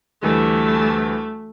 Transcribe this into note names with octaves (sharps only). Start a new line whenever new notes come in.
D2 E3 G3 A3